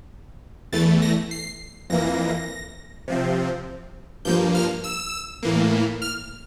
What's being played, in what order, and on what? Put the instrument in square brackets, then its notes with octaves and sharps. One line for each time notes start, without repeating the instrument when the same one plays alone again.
[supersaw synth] E2 E3 A3 A6
A#6
C7
F2 E3 A#3 A#6
C3 F3 C4
G2 F3 A#3 G6
F6
E6
A2 E3 A#3
F6